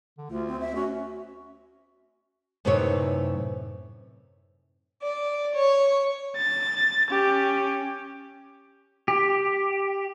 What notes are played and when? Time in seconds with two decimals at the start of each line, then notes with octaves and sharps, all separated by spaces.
0.18 D3
0.30 D2 F4
0.48 C4
0.60 E5
0.76 C#4 F#4
2.65 F#2 A2 C3 D#4 B4 C#5
5.02 D5
5.56 C#5
6.37 A6
7.10 C#4 G4
9.08 G4